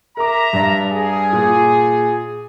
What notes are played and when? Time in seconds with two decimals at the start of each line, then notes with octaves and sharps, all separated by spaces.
0.17 A#4 E5 A#5 D6
0.53 G2 D5
0.91 G#4
1.33 A#2